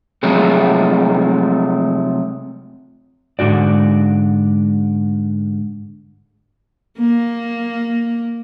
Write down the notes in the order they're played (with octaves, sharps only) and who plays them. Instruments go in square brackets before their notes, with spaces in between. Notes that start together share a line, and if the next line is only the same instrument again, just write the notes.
[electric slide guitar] C3 F3 F#3 G#3 A3
G#2 D3 F#4 D5
[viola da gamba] A#3